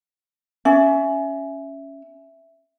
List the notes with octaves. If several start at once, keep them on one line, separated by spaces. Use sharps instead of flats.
C#4 E5